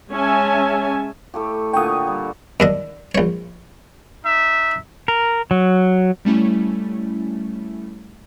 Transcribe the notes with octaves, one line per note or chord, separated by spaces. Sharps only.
G#3 C#4 C#5 E5 G#5 A5
A2 A3 G4
A#2 D3 G5 C#6 D#6
G3
D#2 D4 D#5
A#1 C#5
D#4 E5
A#4
F#3
G3 A3 C#4 E4